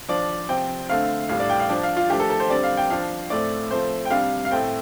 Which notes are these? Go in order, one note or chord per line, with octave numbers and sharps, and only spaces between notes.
F3 D4 D5
C3 F3 C4 G5
D3 A3 C4 F5
A2 G3 D4 F5
D5
G5
F5
F3 D4 D5
F5
F4
F3 A3 D4 G4
A4
A4
C5
D3 G3 C4 D5
F5
G5
F3 D4 F5
A2 A3 C4 D5
F3 A3 C4 C5
G5
C3 G3 D4 F5
F5
A2 A3 C4 G5